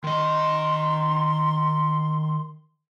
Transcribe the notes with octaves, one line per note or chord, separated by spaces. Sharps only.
D#3 D#5 C6